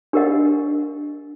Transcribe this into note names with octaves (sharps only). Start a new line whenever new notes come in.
D4 G4 A#4 D#5 F#5